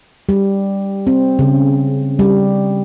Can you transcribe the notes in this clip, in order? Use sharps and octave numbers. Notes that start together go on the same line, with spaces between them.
G3
C4
C#3
G3